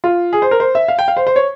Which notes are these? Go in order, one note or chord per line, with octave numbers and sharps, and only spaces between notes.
F4
G#4
C5
A#4
C5
E5
F5
G5
F5
C5
C5
C#5